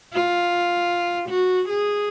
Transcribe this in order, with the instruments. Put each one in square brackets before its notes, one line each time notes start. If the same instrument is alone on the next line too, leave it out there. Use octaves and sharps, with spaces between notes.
[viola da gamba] F4
F#4
G#4